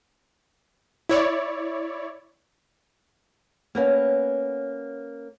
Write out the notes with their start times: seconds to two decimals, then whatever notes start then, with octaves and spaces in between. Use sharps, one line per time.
1.09 E4 C#5 D5
3.75 A#3 B3 C#4